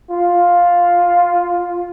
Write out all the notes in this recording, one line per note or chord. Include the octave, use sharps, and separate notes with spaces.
F4